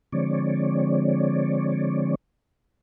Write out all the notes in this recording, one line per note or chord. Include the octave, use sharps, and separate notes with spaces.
D3 F3 G#3 C4 C#5 D5